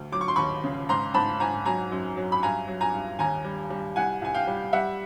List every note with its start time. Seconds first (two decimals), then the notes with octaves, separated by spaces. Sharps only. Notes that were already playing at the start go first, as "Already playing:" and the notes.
Already playing: D2
0.12 F#3 D6
0.21 C#6
0.28 C6
0.36 D#2 B5 C#6
0.64 C#3
0.89 G#2 A#5 C6
1.14 G#2 A5 B5
1.40 G#2 G#5 A#5
1.65 F#3 G#5 A#5
1.92 F#2
2.16 F#3
2.32 B5
2.43 G2 G#5 A#5
2.68 F#3
2.81 G#5 A#5
2.94 G2
3.19 D#2 G#5 A#5
3.44 G3
3.70 G3
3.96 C2 F#5 G#5
4.22 C2 G#5
4.34 F5 G5
4.47 G3
4.73 G3 E5 F#5